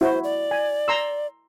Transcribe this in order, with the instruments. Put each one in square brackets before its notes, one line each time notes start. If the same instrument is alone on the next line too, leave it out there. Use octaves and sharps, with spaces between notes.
[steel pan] E4 F#4 [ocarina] C5
[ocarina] D5
[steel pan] G#5
A#5 C6 E6